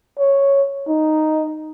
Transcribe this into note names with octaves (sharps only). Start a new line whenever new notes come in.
C#5
D#4